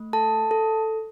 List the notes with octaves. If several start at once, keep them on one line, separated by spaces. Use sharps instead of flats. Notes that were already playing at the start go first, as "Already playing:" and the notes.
Already playing: A3
A4 A5
A4